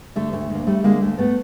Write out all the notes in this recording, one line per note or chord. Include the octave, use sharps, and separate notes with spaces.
D3 A3
D2 A3
D2 A#3
G3 A3
D3 G#3 A#3
D2 A3
A3 B3